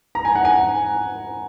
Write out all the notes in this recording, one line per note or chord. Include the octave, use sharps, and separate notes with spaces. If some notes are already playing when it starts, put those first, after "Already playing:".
A#5
G#5
F#5
G#5